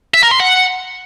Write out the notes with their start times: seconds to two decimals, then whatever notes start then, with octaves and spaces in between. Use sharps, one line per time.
0.14 E5
0.23 A#4
0.31 C6
0.40 F#5